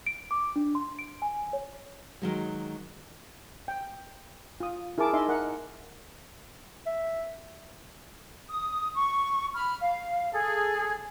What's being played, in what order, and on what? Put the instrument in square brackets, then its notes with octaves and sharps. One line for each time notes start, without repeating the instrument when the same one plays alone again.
[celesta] D7
D6
D4
C6
D7
G#5
C#5
[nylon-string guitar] D#3 F#3 G#3
[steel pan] G5
F4 D#6
E4 G#4 A#4 A5 D6
D#4 D#5 E5 C6
A#4 F#5
[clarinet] E5
[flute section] D#6
C#6
B5 F6
F5
G#4 A4